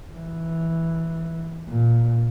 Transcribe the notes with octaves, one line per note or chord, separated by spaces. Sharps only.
E3
A#2